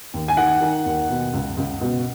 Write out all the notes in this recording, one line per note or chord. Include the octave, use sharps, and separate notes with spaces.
D#2
G#5
D#3 F#5
D#3
D#2
B2
C#2
C#2
B2